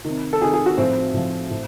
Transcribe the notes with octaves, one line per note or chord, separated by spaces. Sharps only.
C3 D#3
A4
C3 D#3 G#4
G#4
F#4
A2 F3 C4
A2 F3
A2